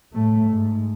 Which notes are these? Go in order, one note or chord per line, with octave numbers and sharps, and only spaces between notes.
A2 A3
G#2